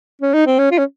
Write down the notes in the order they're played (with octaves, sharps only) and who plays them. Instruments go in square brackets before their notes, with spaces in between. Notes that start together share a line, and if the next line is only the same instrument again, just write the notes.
[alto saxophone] C#4
D#4
C4
C#4
F4
C#4